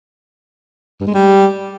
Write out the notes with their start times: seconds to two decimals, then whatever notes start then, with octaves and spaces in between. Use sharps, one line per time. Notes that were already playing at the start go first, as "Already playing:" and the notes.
1.00 G2
1.07 G#3
1.14 G3